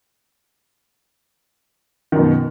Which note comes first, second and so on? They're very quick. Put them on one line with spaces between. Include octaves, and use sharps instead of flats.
D#3 F#2 B2